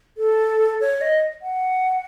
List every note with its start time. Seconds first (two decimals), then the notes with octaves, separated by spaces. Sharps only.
0.18 A4
0.81 C#5
1.01 D#5
1.42 F#5